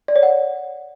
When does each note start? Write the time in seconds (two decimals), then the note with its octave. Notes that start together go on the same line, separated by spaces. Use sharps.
0.08 D5
0.16 C#5
0.23 F#5